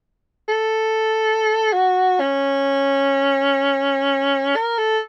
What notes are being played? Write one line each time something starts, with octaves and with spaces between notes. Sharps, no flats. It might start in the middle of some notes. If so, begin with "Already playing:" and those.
A4
F#4
C#4
A#4
A4